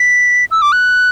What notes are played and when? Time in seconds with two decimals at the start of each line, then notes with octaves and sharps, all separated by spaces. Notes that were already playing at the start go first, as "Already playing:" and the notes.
Already playing: B6
0.51 E6
0.62 D6
0.72 F#6